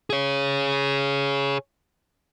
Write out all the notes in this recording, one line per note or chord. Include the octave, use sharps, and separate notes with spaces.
G#4 C#5